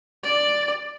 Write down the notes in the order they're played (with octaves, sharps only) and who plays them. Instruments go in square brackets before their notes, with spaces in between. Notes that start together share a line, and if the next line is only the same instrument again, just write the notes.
[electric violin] D5